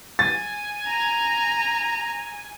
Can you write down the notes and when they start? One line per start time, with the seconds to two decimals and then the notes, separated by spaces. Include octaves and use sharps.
0.19 G#5 A6
0.87 A#5